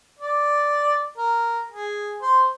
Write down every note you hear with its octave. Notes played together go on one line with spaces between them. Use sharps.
D5
A#4
G#4
C5